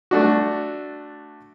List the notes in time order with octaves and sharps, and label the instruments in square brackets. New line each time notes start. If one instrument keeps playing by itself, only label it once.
[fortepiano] A3 D4 F#4